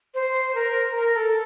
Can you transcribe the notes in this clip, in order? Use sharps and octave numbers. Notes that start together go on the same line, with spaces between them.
C5
A#4
A#4
A4